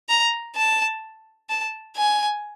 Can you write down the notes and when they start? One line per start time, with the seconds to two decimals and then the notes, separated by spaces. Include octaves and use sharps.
0.09 A#5
0.56 A5
1.49 A5
1.96 G#5